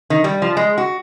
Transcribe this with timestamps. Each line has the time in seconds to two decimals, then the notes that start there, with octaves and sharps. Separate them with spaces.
0.10 D#3
0.24 G3
0.42 F3
0.57 G#3
0.78 F#4